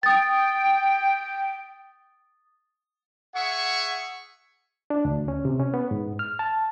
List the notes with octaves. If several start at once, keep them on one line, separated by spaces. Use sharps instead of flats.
G5 D#6 A6
G#4 E5 F#5 C#6
D4
D2
C#4
C3
C#4
B3
G#2
F6
A5